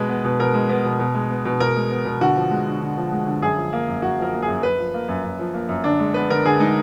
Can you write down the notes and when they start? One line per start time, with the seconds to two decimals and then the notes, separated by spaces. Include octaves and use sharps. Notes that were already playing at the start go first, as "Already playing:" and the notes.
Already playing: B2 G#3 B4
0.09 B3
0.24 B2
0.40 B2 A#4
0.54 G#3
0.69 B3
0.85 B2
1.00 B2
1.14 G#3
1.30 B3
1.45 B2
1.60 B2 A#4
1.76 G#3
1.91 B3
2.05 B2
2.21 D3 F#4
2.35 F3
2.51 G#3
2.67 D3
2.81 D3
2.97 F3
3.12 G#3
3.27 D3
3.42 F#2 G#4
3.57 F3
3.73 A#3
3.88 F#2
4.02 F#2 F#4
4.18 F3 A#4
4.34 A#3
4.42 G#4
4.48 F#2
4.63 F#2 B4
4.78 F3
4.94 A#3
5.08 F#2
5.24 F#2
5.39 F3
5.54 A#3
5.69 F#2
5.84 D3 D4
5.99 G#3
6.14 B3 B4
6.30 D3 A#4
6.45 D3 G#4
6.59 G#3 D#4